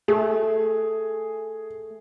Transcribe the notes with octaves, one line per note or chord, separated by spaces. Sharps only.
A3 G#4